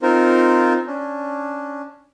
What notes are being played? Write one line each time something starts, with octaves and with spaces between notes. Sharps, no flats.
C4 D#4 F4 A#4 C5
C#4 D4